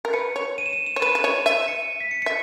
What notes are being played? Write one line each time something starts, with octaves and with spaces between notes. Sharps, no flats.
A#4
B4 C#7
C#5
D#7
E7
D#7
E7
C#5
B4 D#7
B4
C#5
E5 D#7
C#7
B6
C#7
C#7
E5